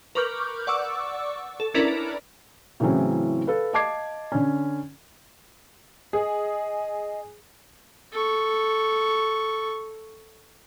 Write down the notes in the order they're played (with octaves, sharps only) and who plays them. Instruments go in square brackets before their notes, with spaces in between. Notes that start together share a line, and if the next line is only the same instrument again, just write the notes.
[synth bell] A#4 B4 C#6 D6 F6 G6
D5 F#5 C#6 D6 E6
A4
C#4 D4 E4 A#4 B4 D5
[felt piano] A2 C#3 E3 F#3 C4 C#4
A4 B4 F5
D#5 F5 A5 D6 G#6 C7
D3 C#4
[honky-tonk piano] G#4 [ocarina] D#5
[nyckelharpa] A4 C#6